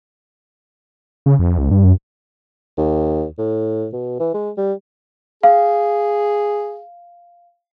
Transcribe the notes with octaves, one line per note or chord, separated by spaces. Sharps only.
C#3
F2
C#2
G2
F#2
D#2
A2
B2
E3
G#3
G3
G#4 F5